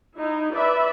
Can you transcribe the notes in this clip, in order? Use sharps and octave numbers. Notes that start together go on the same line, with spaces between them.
D#4 E4
B4 D5 E5 B5